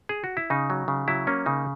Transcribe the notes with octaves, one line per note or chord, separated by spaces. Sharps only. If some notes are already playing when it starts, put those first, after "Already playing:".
G#4
F#4
E4
C#3 D#4
F#3
C#3
F#3 E4
A#3 C#4
C#3 D#4